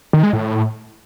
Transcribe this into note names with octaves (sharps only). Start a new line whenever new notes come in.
D#3
G#3
A2